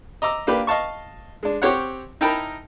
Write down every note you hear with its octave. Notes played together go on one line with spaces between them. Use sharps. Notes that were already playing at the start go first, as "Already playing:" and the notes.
D#5 A#5 D6 E6
A#3 D4 G4 B4
D#5 F5 A5 C#6
G#3 D4
C4 G4 C#5 F#5
D#4 E4 A#4 G5 A5 B5